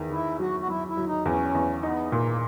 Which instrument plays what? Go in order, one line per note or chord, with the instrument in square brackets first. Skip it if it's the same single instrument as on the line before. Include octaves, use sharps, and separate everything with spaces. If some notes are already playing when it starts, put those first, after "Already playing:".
Already playing: [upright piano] E2 D#3
[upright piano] D#3 [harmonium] E4
[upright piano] F#3 [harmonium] F#4
[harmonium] F#4
[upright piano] F#3 [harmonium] E4
[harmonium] E4
[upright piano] F#3
[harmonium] D#4
[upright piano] E2 [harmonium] C#4
[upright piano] E2
[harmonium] B3 [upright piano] D#4
[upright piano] A#2 [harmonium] A#3